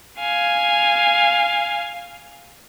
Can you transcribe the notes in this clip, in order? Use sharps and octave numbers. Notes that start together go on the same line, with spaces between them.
F5 G#5